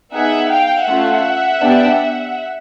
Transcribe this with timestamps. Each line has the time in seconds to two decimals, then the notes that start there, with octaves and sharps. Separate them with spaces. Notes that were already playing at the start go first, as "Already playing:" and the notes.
0.12 B3 D#4 G#4 E5 F#5
0.50 F5 G5
0.86 A3 C#4 F4 E5 F#5
1.61 B3 D4 G4